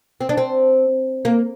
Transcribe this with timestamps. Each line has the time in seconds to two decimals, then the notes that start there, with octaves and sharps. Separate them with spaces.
0.21 C4
0.29 D4
0.37 C4
1.25 A#3